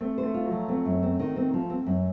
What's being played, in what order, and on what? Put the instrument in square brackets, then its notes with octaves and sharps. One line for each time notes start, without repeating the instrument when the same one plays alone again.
[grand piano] A3 [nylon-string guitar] C4
[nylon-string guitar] C5
[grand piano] A3
[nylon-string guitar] F4
[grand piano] F#3
[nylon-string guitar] F3
[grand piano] A3 [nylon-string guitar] C4
[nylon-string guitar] F#2
C4
D#3
C4
F3
C4
F#2